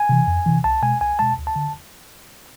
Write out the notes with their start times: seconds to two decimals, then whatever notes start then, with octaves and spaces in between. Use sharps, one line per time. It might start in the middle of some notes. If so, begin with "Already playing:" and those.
Already playing: G#5
0.09 C3 E3
0.27 F2
0.46 C3 E3
0.64 C2 A5
0.82 B2 G#3 G#5
1.01 C2 G#5
1.19 B2 G#3 A5
1.38 D2
1.47 A5
1.56 D3